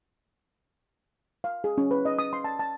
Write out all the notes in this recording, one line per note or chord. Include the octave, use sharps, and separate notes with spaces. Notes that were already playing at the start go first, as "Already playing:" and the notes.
F5
G#4
C#4
B4
D#5
D#6
C6
A5
A5